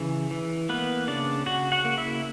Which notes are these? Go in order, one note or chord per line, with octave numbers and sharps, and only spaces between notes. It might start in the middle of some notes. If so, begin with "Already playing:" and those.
Already playing: C#3 E3
E3
A#3 B3 B4
C#3 D4 D5
C#3 F#4 F#5
F#4 F#5
A#3
E4 E5